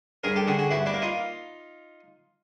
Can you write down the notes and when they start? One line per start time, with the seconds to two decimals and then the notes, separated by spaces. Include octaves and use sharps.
0.24 G2 G#4 A#4
0.36 G4 A4
0.47 D3 F#4 G#4
0.59 F#4 G#4
0.70 G2 E4 F#4
0.86 D4 E4
0.94 A#3
1.02 D#4 F4